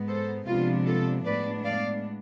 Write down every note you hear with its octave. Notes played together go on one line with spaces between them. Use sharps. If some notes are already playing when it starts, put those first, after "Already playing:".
Already playing: G#2 G#3 B3
A4 C5
C3 F3 G#3 B3 D4 F4
F4 A4
A2 G#3 B3 D4 B4 D5
D5 F5